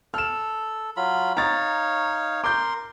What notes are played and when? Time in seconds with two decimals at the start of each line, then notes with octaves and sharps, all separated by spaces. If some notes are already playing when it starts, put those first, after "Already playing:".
0.14 A4 F6 E7
0.97 F#3 F4 B5
1.37 D#4 C#5 F5 A#5 A6
2.44 A#4 C6 D6 G6